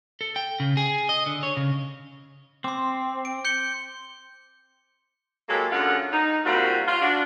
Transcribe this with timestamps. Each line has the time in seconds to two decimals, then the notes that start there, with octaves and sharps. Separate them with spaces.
0.21 A4
0.36 G5
0.60 C#3
0.77 G#4
1.09 D#5
1.26 D3
1.43 C#5
1.57 C#3
2.64 C4 C6 D6
3.25 D7
3.45 G6 C#7 G7
5.49 F#3 G#3 A#3 G4 A4
5.71 F#2 D3 G#3 C#4 F4 F#5
6.12 D#4
6.45 A#2 G3 C4 F4 F#4
6.87 F4
7.02 D4 F#4